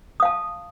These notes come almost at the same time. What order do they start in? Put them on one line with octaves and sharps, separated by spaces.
D#6 F5 A5